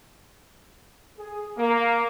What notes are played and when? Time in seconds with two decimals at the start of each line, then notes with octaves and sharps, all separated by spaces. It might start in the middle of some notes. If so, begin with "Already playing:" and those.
1.18 G#4
1.58 A#3